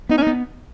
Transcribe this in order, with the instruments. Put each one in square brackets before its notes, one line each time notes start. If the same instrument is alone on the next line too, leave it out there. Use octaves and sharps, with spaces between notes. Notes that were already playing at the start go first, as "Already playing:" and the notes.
[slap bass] B3 [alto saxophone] D#4
[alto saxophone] C#4
D#4
[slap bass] B3